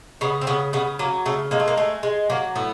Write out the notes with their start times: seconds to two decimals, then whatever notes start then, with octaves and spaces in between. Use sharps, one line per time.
0.21 C#3 B3
0.41 C4
0.47 C#3 B3
0.73 C#3 B3
0.99 F#3 A#3
1.26 C#3 A3
1.51 G#3 A#3
1.60 A3
1.68 A#3
1.77 G#3 A3
2.03 G#3
2.30 F#3 A#3
2.56 A2 B3